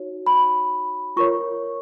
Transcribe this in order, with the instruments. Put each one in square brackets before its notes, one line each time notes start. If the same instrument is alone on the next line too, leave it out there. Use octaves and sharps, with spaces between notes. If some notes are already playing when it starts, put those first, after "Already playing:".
Already playing: [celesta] D#4 F#4 C#5
B5
F4 A#4 C#5 C#6